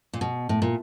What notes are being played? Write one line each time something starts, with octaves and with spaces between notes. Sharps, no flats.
A#2
B2
A2
A#2